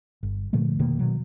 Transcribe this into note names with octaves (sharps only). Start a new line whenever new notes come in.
G1
A#2 D3 F3 A3
F1 B2 D#3 A#3
B2 D#3 F#3